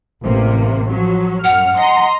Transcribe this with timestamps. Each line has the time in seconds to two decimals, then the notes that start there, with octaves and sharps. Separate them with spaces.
0.22 A1 C3 A#3
0.88 F3 F#3
1.44 F#2 F#5 F6
1.77 D#5 A#5 C6